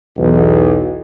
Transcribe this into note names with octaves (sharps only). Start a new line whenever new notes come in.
B1 E2